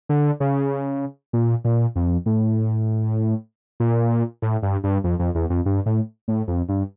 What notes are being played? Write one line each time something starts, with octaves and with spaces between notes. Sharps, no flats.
D3
C#3
A#2
A#2
F2
A2
A#2
A2
G2
G2
F2
F2
E2
F2
G2
A2
A2
F2
G2